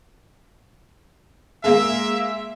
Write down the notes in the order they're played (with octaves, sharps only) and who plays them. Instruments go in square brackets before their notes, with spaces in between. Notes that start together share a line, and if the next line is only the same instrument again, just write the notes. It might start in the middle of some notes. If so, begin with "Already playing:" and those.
[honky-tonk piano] G#3 A#3 [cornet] E5